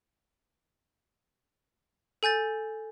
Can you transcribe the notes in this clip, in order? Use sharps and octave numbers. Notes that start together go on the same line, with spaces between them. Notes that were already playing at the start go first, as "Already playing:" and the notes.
A4 G#5 G6 A6